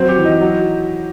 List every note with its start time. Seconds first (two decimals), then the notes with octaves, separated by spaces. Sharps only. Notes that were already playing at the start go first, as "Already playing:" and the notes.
Already playing: F#3 C4
0.09 G4
0.17 E3
0.25 D#4
0.41 F#3